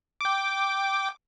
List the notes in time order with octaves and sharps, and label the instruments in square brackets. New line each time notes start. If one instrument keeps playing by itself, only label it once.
[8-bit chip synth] G5 D6